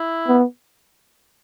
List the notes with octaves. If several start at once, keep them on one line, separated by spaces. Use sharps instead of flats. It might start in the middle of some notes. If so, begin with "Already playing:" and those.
Already playing: E4
B3